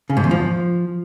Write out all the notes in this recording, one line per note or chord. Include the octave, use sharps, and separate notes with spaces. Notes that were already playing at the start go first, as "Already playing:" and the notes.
C#3
G#2
E2
F3